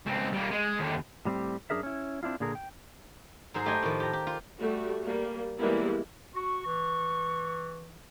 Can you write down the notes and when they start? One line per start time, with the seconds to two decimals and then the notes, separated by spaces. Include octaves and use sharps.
0.06 C#2 C4
0.33 G3 A#3
0.51 G#3
0.79 D#2 D3
1.25 A2 G3 C4 G4
1.70 F#2 D4 G#4 A#4 E5
1.83 C#4 E4
2.23 C4 D4 E4 F4
2.40 A#2 D3 G#4 A#4
2.55 G5
3.54 G#2 F#3 G#4 C5
3.65 A3 G4 D#5 G5 G#5
3.83 A2 D#3 F3
4.00 G4 A#5
4.13 G4
4.27 F4
4.58 G3 A3 F#4
5.04 G3 A#3
5.60 E3 G3 G#3 A#3 B3 E4
6.35 F#4 C#6
6.67 E3